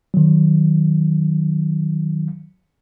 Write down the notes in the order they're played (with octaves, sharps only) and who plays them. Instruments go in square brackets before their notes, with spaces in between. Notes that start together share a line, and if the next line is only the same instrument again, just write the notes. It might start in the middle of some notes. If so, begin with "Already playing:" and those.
[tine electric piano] D#3 F#3